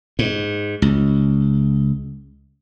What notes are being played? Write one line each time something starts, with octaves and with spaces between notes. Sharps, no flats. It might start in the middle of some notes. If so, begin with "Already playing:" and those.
G#2
C#2